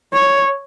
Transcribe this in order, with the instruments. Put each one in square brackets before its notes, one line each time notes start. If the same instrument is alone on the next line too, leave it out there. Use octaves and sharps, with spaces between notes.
[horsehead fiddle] C#5